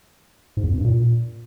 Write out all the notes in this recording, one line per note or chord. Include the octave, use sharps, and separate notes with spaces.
G#2
E2
F2
G2
A#2